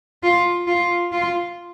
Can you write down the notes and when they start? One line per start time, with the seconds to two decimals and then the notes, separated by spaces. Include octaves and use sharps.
0.23 F4
0.67 F4
1.12 F4